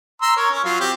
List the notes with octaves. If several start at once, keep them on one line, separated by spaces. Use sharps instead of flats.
A#5 C6 E6
A#4 C#5
C#4
F#3 F4
C4 G4